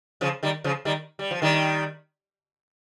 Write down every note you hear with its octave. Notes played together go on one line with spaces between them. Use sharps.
C#3 F3
D#3 G3
C#3 F3
D#3 G3
G3
F3
D#3 G3